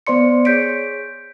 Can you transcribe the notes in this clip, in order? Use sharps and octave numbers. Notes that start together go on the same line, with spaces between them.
B3 C5 D5 C6 C#7
G#4 C#5 G6 B6 D7